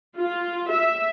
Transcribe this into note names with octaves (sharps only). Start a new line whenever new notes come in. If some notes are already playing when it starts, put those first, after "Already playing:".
F4
E5